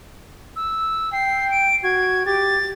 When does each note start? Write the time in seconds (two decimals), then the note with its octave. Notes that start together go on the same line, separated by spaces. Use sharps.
0.56 E6
1.13 G5 C7
1.51 D7
1.83 F#4 G#6
2.26 G4 A6